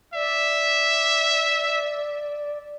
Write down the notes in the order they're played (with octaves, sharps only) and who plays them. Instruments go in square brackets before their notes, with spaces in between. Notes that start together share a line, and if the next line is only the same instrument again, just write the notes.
[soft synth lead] D5 [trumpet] E5